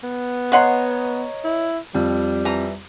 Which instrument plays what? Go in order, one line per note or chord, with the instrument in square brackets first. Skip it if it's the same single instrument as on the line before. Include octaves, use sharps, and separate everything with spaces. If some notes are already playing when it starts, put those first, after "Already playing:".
[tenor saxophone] B3
[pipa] B4 F#5 C6 [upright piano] C#5 D#5 A#5
[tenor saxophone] E4
[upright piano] F2 [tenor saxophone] G3
[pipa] E3 A#5